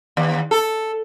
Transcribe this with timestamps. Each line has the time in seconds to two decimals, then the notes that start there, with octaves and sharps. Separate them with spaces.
0.17 D#2
0.51 A4